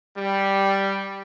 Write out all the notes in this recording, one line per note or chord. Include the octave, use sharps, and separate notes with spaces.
G3